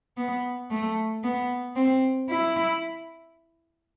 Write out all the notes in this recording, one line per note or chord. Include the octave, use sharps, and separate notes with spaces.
B3
A3
B3
C4
E4